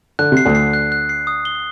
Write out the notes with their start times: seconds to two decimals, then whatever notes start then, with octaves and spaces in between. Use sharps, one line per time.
0.19 D3 F#6
0.32 C3 C7
0.45 D2 D3
0.55 C7
0.73 F#6
0.92 F#6
1.09 C7
1.27 D#6
1.45 G7